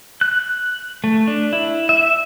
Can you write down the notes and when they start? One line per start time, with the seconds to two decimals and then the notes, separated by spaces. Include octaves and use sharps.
0.21 F#6
1.04 A3
1.27 D4
1.53 E4
1.89 E5